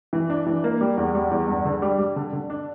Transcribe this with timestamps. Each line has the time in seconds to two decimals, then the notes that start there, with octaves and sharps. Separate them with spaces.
0.13 E3
0.30 D4
0.47 E3
0.64 A#3
0.81 G3
0.97 E2
1.15 G3
1.31 E2
1.48 G2
1.65 D3
1.82 G3
1.99 G3
2.16 D3
2.33 D3
2.50 D4